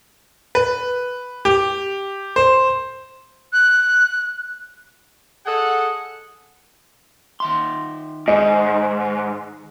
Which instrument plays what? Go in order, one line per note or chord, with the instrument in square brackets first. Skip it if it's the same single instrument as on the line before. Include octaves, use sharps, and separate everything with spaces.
[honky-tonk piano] B4
G4
C5
[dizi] F#6
[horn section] G#4 A4 D#5 F#5
[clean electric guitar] D#3 E5 C6
[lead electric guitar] G#2 [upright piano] D#5